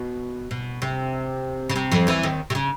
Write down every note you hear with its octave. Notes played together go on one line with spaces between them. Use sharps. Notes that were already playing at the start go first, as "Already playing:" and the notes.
Already playing: B2
B2
C3
C#3
C3
F2 F3
E2 E3
D#2 D#3
C3
C#3